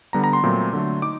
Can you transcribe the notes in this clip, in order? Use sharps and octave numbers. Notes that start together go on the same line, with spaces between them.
D3 G3 B3 A#5
A#5
C6
A#2 F#3 A3 C4
D3 F#3 A3
D#4 D6